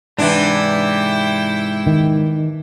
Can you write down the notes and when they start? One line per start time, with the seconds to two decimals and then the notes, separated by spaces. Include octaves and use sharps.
0.18 G#2 C3 E3 D4 E4 G5
1.87 D#3